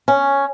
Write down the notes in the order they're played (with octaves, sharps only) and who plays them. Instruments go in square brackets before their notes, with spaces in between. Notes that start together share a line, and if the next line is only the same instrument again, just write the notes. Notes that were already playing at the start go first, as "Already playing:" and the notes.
[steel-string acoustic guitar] C#4